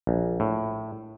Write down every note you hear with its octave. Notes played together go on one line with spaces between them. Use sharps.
A#1
A2